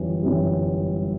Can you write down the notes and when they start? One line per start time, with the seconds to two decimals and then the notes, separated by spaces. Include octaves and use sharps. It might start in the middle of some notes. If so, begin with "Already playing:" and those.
Already playing: G1 F#2 E3 G3
0.23 G1 F#2 E3 G3